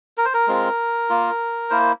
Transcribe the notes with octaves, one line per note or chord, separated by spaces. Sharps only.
A#4
C5
A#4
G#3 C4 F4
A#3 F4
A#3 E4 C5